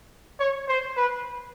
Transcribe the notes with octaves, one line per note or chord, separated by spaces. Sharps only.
C#5
C5
B4